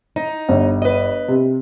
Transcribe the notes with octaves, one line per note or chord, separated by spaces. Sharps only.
D#4
G1
B4 D#5
C3